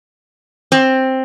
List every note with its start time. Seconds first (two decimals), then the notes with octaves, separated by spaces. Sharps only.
0.72 C4